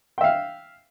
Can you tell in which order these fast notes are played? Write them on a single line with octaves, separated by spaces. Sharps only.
G5 E5 F5